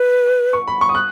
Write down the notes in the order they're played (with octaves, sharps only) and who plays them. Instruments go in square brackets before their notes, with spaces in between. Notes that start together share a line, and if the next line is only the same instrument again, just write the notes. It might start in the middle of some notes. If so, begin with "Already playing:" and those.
Already playing: [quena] B4
[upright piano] C#6
B5
C#6
D#6
F#6